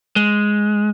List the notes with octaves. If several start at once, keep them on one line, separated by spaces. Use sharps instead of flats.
G#3